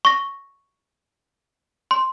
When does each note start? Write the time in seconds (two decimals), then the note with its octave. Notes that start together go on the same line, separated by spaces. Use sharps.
0.05 C#6 A#6
1.91 C6